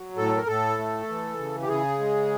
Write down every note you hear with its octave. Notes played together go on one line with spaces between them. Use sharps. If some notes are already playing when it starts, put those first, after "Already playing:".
Already playing: F#3
A2 A4
A#4
A2 A4
A3
E3
C#3
G4
C#3 G#4
G#3